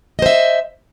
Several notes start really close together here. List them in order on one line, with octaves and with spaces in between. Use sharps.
D#5 C5 E5